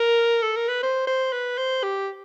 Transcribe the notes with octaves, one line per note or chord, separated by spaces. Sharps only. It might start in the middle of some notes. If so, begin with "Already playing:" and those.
Already playing: A#4
A4
A#4
B4
C5
C5
B4
C5
G4